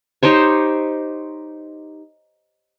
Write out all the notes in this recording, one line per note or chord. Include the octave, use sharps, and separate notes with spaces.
D#4 G4 C5 C#5